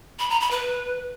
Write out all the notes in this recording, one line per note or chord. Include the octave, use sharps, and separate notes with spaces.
B5
A#5
B5
B4